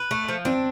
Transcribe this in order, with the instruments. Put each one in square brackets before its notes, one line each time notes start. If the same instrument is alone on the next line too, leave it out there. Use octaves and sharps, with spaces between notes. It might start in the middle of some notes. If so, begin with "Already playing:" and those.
Already playing: [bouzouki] B4
A3
F3
[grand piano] C4 [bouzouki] D4